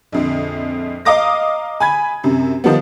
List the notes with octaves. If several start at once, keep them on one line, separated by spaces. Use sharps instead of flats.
A#1 F2 D3
D#5 F5 A#5 D6 D#6 A#6
G#5 B5 G#6
F#2 C3
D#3 F3 G3 B3